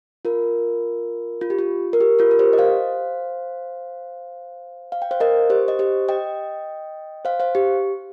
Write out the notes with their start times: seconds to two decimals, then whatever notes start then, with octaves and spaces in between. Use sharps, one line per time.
0.25 F4 A#4
1.41 F4
1.50 G4
1.59 F4
1.93 A#4
2.00 G4
2.19 F4 A#4
2.31 A#4
2.39 G4 C5
2.53 D#5
2.58 C5 F5
4.92 F5
5.02 G5
5.11 C5 F5
5.20 A#4 D#5
5.50 G4 C5
5.68 D#5
5.79 G4 C5
6.09 D#5 G5
7.25 C5 F5
7.40 C5 F5
7.55 G4